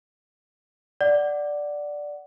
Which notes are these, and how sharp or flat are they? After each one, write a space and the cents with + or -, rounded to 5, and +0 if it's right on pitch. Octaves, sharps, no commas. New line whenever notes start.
D5 +0 F#5 +5